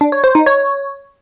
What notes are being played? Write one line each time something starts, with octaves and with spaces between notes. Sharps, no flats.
D4
C#5
C5
D#4
C#5